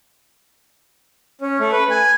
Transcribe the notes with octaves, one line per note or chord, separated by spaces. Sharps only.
C#4
A3
B4
G#5